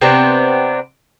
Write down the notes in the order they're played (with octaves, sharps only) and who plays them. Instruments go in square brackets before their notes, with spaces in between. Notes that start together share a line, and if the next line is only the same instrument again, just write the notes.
[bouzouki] C3 B3 C4 D4